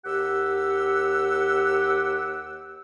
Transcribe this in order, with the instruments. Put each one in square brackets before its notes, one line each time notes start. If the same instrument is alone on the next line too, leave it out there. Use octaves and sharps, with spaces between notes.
[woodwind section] D#2 G4 F#5 E6